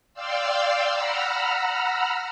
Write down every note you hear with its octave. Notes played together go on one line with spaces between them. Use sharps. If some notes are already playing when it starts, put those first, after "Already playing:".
D5 F5 G5 C6 E6
F#5 A#5 B5 E6 F6